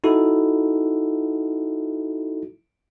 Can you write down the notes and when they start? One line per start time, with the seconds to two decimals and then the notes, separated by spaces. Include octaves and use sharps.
0.04 D#4 E4 F#4 A4